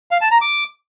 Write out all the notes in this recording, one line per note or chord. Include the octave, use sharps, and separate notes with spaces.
F5
A5
A#5
D6